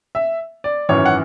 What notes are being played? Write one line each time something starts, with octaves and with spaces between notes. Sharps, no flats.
E5
D5
G#1 F#2 E3 C#5
F#5